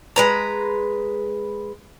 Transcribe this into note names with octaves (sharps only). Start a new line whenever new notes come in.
G#3 B4 A#5